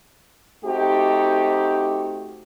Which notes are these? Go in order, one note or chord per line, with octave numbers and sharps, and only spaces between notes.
A3 C4 D#4 F#4 G4